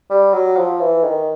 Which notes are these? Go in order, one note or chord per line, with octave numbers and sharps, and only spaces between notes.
G3
F#3
F3
E3
D#3